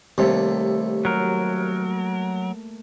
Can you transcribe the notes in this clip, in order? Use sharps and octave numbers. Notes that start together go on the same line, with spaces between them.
D#2 C3 G3 A3 A#3
F#3 A#4